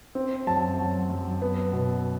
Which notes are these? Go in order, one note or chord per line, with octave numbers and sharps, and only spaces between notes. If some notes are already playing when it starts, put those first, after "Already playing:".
C4
F#2 A5
F#3
F#2
B3
B2